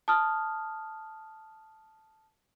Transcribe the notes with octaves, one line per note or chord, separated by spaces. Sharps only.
A5 D#6 F6